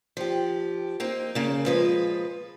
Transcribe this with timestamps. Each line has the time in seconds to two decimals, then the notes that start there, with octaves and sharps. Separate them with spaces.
0.17 F3 G4
1.00 A#3 C4 D#4
1.35 C#3 A#3
1.66 F3 G#3 B4